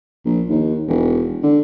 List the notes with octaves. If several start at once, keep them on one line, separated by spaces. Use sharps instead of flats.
A#1
D#2
E1
D3